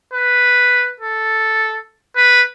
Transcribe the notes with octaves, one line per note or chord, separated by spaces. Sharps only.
B4
A4
B4